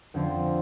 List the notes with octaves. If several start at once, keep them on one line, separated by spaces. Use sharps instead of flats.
F2 D3 F3 C4 F4